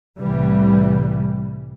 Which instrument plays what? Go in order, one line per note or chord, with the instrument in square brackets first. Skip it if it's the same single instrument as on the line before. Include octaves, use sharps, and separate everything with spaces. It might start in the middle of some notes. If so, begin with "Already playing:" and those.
[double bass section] C2 A2 E3 G3